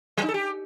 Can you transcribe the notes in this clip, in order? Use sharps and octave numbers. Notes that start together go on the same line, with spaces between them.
F#3
D#4
A4
G4